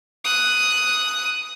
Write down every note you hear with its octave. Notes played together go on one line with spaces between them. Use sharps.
D#6 F#6